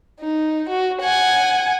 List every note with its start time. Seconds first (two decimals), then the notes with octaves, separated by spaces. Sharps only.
0.20 D#4
0.69 F#4
1.01 F#5 G#5